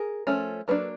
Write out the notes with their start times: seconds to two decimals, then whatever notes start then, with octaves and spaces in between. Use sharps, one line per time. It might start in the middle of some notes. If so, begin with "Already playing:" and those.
Already playing: G#4 A#4
0.27 F3 A3 C#4
0.68 F#3 A#3 D4 A4 B4